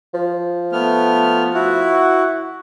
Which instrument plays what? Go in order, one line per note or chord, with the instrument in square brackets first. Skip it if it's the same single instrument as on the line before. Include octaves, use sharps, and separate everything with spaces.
[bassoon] F3
[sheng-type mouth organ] A3 B3 F6
E4 F#4